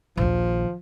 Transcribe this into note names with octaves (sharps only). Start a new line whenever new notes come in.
A#1 D#2 F3